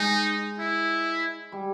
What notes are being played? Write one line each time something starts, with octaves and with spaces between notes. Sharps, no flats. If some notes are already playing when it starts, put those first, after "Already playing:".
Already playing: G#3 D#4
E4
G3